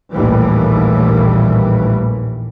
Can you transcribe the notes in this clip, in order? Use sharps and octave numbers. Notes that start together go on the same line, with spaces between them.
A#1 D#2 A2 E3 G3